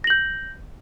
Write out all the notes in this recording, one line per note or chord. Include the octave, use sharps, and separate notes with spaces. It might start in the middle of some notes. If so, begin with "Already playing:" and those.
G6 A#6 F#7